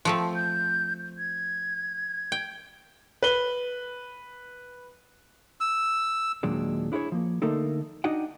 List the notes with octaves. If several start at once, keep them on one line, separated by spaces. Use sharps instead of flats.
F3 A3 C4
G6
G#6
G5
B4 G7
E6
D#2 A#2 F#3 G#3 D4
D4 E4 G#4 B4 C#5
F3 A#3
D3 A3 A#3 D#4 A4 A#4
D4 D#4 F#4 D#5 F#5 G5